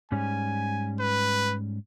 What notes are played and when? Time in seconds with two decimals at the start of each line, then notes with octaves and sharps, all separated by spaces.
0.12 G#2 G3 C#4 G#5
1.00 B4